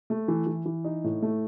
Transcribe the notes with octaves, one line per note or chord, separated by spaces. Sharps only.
A3
E3
E3
E3
D#4
A2
A3